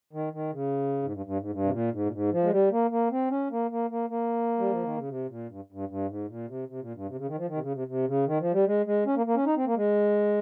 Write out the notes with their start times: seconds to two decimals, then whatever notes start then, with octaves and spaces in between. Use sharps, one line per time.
0.13 D#3
0.33 D#3
0.52 C#3
1.02 G#2
1.13 G2
1.26 G2
1.39 G#2
1.52 G2
1.64 C3
1.72 A#2
1.92 G#2
2.06 A#2
2.12 G#2
2.32 F3
2.43 G#3
2.51 G3
2.71 A#3
2.91 A#3
3.11 C4
3.30 C#4
3.51 A#3
3.71 A#3
3.90 A#3
4.10 A#3
4.59 G3
4.71 F3
4.84 D#3
4.96 C#3
5.09 C3
5.29 A#2
5.49 G2
5.72 G2
5.89 G2
6.09 G#2
6.28 A#2
6.48 C3
6.68 C3
6.81 A#2
6.95 G2
7.08 C3
7.18 C#3
7.27 D#3
7.38 F3
7.48 D#3
7.56 C3
7.61 C#3
7.74 C3
7.88 C3
8.07 C#3
8.27 D#3
8.40 F3
8.53 G3
8.67 G#3
8.86 G#3
9.06 C#4
9.16 A#3
9.26 A#3
9.36 C#4
9.46 D#4
9.56 C4
9.66 A#3
9.76 G#3